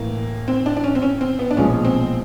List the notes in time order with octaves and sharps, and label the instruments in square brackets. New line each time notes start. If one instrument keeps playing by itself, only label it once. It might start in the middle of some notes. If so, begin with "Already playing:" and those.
Already playing: [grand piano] A2 E3 [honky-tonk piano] A#3
[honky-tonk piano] C4
D4
D4
C#4
C4
C#4
C4
B3
D4
[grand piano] B1 A#2 F3 G#3 [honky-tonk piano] C#4
[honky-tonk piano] C4